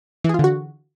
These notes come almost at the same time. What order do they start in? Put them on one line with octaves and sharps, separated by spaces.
E3 G#4 F4 D3 F#4